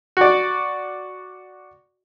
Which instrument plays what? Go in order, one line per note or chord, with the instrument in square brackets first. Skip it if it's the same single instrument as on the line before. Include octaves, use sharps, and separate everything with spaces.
[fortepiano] F#4 D5